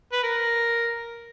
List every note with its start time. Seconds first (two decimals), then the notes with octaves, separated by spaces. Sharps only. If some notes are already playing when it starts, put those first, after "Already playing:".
0.12 B4
0.23 A#4